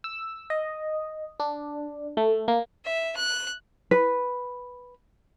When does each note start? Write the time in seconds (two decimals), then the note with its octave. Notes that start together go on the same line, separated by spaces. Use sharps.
0.04 E6
0.50 D#5
1.40 D4
2.17 A3
2.48 A#3
2.85 E5
3.17 F#6
3.91 B4